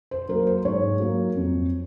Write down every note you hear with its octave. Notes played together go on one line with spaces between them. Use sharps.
C5
F#3 A#3 A#4
C5
G#2 C#5
F#3 A#3
F2